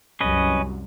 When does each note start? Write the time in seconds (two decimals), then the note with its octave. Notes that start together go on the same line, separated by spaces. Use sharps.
0.21 C2 F#2 C#4 B4 D#5